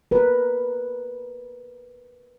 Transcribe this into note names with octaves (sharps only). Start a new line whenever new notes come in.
A#4 B4